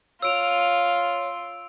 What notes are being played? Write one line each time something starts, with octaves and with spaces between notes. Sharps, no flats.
F4 C#5 E6 D7 F7